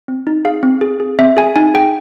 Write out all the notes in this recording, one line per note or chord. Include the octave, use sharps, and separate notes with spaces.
C4
D#4
G#4 F5
C4
G#4
G#4
C4 E5
G#4 G#5
D#4 G#5
G#4 G5